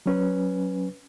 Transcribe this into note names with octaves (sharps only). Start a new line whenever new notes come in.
F#3 C#4 B4